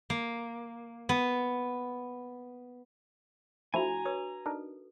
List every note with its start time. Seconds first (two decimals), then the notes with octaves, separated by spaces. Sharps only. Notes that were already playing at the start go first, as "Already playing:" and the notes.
0.10 A#3
1.09 B3
3.74 F3 A3 D4 E4 F#4 G#5 A#5
4.05 B4 C#5 D#6
4.46 D4 D#4 A4 A#4